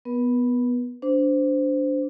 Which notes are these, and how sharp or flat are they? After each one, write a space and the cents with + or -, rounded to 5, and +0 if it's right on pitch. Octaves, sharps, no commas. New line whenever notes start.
B3 +0 B4 -45
D4 -15 C5 -15